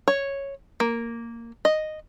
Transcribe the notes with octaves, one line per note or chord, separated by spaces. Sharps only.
C#5
A#3
D#5